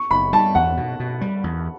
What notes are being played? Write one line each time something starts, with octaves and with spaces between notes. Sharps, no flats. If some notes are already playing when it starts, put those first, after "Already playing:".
Already playing: C#6
F#1 B5
G3 A5
E2 F#5
B2
B2
G3
E2